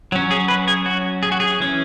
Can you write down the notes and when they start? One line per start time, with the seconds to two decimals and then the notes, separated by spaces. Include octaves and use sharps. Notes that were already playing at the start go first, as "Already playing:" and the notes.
0.12 F#3 C#4
0.31 G#4
0.48 B4
0.68 G#4
0.86 F#4
1.23 G#4
1.32 F#4
1.40 G#4
1.60 E3 C#4